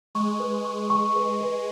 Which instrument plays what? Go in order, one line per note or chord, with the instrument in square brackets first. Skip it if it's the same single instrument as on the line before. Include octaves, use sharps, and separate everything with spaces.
[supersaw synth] G#3 [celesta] C#6
[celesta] B4
C#6
C#6
B4
B4